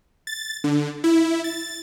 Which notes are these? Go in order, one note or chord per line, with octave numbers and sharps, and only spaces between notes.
A6
D3
E4
A6